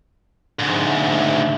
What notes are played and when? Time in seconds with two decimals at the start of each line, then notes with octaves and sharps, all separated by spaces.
0.60 D2 G#2